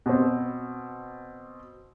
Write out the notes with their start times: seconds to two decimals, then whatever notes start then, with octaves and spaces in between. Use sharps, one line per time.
0.06 B2 C4